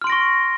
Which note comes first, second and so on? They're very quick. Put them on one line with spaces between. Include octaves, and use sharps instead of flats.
F6 C6 D7 A#6 C#6